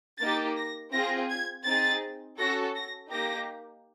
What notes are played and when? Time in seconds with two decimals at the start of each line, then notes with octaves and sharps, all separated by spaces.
0.20 A#3 D#4 G4 A6
0.56 A#6
0.93 C4 F4 G#4 A#6
1.29 G#6
1.65 C4 D#4 G#4 A6
2.38 C#4 F#4 A4 A#6
2.75 A#6
3.11 A#3 D#4 G4 A#6